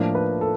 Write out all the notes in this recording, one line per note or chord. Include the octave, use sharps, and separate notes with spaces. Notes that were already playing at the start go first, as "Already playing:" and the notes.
Already playing: A2 F3 A#3 D4
B4
A4